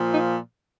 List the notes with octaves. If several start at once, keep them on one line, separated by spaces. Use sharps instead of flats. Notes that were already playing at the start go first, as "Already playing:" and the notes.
Already playing: A#2 F3
D#4